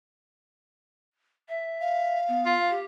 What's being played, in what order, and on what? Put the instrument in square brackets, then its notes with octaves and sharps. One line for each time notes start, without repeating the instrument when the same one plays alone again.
[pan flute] E5
[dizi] F5
[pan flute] B3
[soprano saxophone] F4
[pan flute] G4